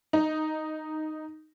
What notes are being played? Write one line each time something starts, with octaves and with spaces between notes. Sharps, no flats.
D#4